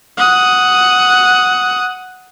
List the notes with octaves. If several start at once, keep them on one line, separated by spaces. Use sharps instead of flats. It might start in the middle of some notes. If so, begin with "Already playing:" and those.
F#5 D#6